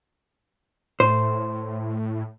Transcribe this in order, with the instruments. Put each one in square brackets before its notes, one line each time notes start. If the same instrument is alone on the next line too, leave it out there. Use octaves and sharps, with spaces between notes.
[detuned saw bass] A2 [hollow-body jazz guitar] C5